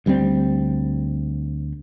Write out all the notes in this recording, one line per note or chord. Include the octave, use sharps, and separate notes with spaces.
D2 G3 A#3 C4